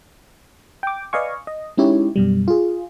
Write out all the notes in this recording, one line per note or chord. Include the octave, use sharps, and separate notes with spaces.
G5 D6
B4 D5 D#5 F5 G#5 C#6
D#5
G#3 C#4 D#4 E4 G4 C#5
F#2 B2 G3
F4 G#4